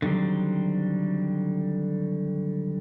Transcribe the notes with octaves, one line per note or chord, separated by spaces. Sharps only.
D3 D#3 F#3 G3 C4